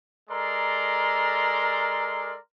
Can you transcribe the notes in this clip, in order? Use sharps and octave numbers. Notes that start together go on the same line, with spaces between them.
G#3 A4 A#4 D5 A#5 C6